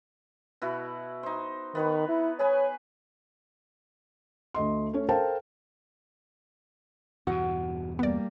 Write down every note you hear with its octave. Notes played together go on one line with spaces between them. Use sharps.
B2 E4 F#4
D#4 C5
D#3 B3 B4 C#5
E4
G#4 B4 C#5 G#5
D2 A3 D#5 C6
A3 C#4 C#5
A4 A#4 C5 F5 G5 A5
E2 G2 B2 F#4 F#5
G3 A#3 B3 D5